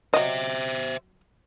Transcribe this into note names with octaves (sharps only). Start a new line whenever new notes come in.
F#3 C5 D#5 E5